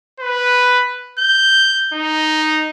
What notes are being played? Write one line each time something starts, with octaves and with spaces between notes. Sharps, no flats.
B4
G6
D#4